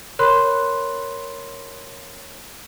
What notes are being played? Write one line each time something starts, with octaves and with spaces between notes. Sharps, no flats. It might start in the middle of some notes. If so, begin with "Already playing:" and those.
A#4 C#5 B5 C6 F#6